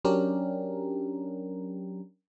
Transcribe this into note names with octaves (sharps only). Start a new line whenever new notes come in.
F#3 C#4 D4 G4 A#4